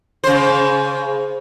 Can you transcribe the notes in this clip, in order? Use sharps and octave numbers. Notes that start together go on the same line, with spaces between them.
C#3 C5